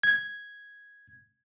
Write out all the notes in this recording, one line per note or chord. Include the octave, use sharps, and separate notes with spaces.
G#6